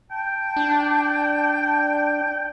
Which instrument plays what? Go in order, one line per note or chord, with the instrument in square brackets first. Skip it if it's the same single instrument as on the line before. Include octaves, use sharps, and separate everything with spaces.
[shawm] G5 [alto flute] A5
[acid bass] D4